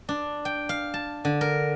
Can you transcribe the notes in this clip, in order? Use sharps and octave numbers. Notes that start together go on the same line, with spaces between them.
D4
G5
F5
A5
D3
A#4